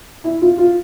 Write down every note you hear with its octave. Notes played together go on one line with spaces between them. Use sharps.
E4
F4
F4